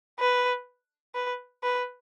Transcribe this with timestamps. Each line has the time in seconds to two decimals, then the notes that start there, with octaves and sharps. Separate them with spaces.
0.19 B4
1.15 B4
1.63 B4